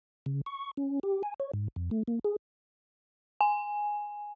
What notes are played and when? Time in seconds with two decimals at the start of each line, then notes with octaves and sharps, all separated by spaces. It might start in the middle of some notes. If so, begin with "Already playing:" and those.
0.26 C#3
0.46 C#6
0.77 C#4
1.03 G4
1.23 G#5
1.40 C#5
1.54 G#2
1.76 F2
1.91 A3
2.08 A#3
2.25 G#4
3.41 G#5